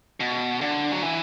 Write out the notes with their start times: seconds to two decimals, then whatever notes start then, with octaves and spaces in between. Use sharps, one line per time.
0.20 B2
0.61 D3
0.91 F#3
1.02 E3